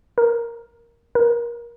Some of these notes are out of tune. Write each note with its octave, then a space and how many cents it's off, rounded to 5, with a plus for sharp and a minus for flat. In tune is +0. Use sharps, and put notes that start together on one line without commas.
A#4 +0
A#4 +25